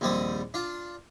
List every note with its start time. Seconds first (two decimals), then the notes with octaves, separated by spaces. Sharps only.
0.01 A#1 D#2 G3 C4 D5 D#6
0.54 D4 F4